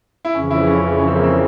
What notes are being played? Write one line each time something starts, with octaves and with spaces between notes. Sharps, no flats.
E4
F2 C#3 E3 C#4
E4
C#4
C#4
C4
A#3
C4